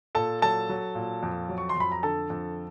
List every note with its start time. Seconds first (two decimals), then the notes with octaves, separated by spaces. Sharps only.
0.15 A#2 A4 A5
0.42 F#3 A4 A5
0.69 F#3
0.95 A#2
1.23 F2
1.49 F#3
1.58 C#6
1.69 C6
1.77 F2 B5
1.92 A#5
2.03 D3 A4 A5
2.30 F2